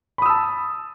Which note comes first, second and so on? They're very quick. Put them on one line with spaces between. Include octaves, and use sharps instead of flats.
B5 D#6 E6 A5